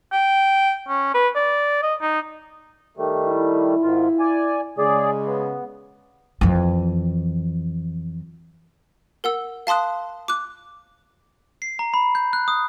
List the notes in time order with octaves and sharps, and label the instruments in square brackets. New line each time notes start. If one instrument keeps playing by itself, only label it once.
[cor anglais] G5
C#4
B4
D5
D#5
D#4
[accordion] D#3 G3 A3
[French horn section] E4
[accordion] G#2 D#3 F4
D5 G#5
[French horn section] C#3 G#3 [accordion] G#4 D5
[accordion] B3
[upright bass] F2 E3
[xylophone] A#4 F#5 E6
F5 A5 C6 D#6 F#6
D6 F#6
[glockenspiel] C7
A#5
B5
G6
F#6
D#6